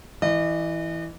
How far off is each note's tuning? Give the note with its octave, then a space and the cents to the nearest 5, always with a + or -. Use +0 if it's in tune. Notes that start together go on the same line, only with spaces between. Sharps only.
E3 +0 D#5 -40